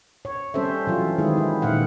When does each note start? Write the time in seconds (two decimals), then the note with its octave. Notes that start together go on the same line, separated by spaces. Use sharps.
0.25 C#5
0.54 G3 C4 C#4 A4 C5 E5
0.87 E3 F#3 F4
1.18 D#3 G#3 C4 E4 G#4
1.37 E4
1.62 A#2 D#3 F5 F#5